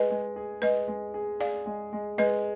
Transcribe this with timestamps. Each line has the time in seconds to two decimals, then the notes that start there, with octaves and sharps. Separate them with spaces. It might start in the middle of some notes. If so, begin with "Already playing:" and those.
Already playing: G#3 B4 D#5
0.10 G#3
0.36 G#4
0.62 G#3 B4 D#5
0.88 G#3
1.14 G#4
1.40 G#4 D5 F5
1.66 G#3
1.93 G#3
2.18 G#3 B4 D#5